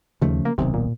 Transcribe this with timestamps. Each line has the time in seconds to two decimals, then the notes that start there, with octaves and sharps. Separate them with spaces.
0.22 D#2 C#3 F3 A3
0.45 A#3
0.58 D1 B1 C3 D#3
0.74 A#2